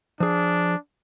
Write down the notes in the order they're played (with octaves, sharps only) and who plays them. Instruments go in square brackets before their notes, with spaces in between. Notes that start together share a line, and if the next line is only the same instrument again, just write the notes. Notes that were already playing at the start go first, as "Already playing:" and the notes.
[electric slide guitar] F3 G#4 [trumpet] D4